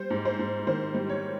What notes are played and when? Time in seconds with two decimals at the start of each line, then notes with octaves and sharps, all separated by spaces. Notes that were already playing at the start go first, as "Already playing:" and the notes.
Already playing: G3 C5
0.10 G#2
0.25 C5
0.39 G#2
0.67 D#3 C5
0.94 G3
1.10 C#5